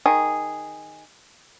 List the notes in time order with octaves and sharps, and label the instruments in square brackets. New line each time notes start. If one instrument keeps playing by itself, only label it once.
[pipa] D#3 G#4